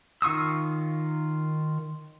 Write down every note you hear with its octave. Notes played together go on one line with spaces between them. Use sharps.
D#3 F4 C#6 D#6 E6